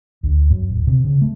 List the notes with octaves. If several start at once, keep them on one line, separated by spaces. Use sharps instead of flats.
D2
F#2
D1
C3
C#3
A3